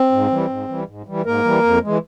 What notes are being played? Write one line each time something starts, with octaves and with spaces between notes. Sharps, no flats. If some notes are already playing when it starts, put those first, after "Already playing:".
Already playing: C4
G#2
E3 G3
G#2
E3 G3
G#2
E3 G3
G#2 A#3 A#4
E3 G3
F2
E3 G#3